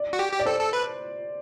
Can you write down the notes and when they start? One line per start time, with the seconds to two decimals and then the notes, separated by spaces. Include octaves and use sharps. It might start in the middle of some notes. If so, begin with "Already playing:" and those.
Already playing: D5
0.13 F#4
0.19 G4
0.33 G4
0.39 D5
0.46 A4 C5
0.60 A4
0.73 B4